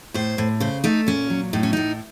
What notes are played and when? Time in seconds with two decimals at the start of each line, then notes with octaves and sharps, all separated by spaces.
0.14 A2 C5
0.38 A2
0.60 C#3 C5
0.84 A3 D#4
1.07 A#2 C#4
1.30 F#3
1.53 A2 D#4
1.63 C#4
1.73 A2 D#4